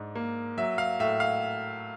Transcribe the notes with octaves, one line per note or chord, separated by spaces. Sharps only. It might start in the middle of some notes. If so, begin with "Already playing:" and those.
Already playing: G#2 D4
A#3
F#3 E5
F5
A2 E5
F5